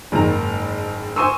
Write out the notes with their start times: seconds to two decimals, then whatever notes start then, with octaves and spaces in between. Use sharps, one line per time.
0.12 F#1 G#2 D#3 A#5
1.16 C5 G#5 C6 C#6 D#6 E6